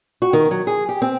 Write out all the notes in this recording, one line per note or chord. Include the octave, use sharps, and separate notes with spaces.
F#4
D#3
F#3
G#4
G4
C4